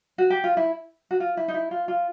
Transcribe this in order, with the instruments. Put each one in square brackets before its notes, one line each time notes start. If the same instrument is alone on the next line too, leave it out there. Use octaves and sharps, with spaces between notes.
[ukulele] F#4
G4
F4
E4
F#4
F4
E4
D#4
E4
F4
F4